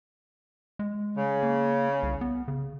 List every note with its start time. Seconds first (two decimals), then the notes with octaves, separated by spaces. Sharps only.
0.79 G#3
1.17 C#3
1.43 A#3
2.03 C2
2.21 B3
2.48 C#3